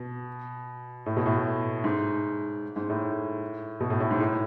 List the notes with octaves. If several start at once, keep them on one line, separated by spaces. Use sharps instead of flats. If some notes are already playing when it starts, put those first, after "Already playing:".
Already playing: B2
A2
B2
A2
G#2
G#2
A2
B2
A2
A2
G#2
A2